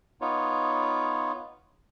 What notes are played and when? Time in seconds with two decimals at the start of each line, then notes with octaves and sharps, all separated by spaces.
0.21 B3 D#4 F4 C#5